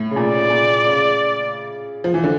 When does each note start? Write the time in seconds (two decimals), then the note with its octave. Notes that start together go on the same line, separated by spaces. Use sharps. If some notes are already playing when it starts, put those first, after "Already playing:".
Already playing: A2
0.11 C#3
0.16 A#2 D5
0.33 C#3
0.50 A#2
0.86 C#3
2.04 F3
2.14 E3
2.24 D3